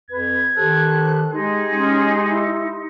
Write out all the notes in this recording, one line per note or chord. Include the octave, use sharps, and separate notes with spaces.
F2 B4 G#6
D#3 G4 A4 C5 F#6
G#3 D#4 G4 G#4 C6
G#3 C#4
E4